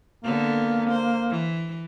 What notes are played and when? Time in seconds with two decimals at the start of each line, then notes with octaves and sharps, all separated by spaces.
0.24 D3 A#3 B3
0.90 C5
1.30 E3